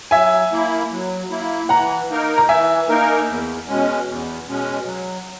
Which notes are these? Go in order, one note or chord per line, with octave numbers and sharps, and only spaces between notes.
F#3 E5 G#5
A#3 E4
F#3
A#3 E4
E3 F#5 A#5
A#3 D#4 A#4
A#5
E3 E5 G#5
A#3 D#4 A#4
E2
B2 G#3 C#4
E2
B2 G#3 C#4
F#3